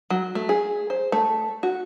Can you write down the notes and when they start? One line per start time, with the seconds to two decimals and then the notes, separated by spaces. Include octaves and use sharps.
0.10 F#3
0.35 A3
0.49 G#4
0.90 C5
1.12 A3
1.63 F#4